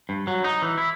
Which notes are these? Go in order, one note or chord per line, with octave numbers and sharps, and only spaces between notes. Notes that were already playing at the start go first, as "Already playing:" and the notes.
G2
F#3
D#4
E3
E4